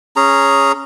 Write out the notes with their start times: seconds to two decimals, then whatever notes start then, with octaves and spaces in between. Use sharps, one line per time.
0.16 C#4 G#4 A#5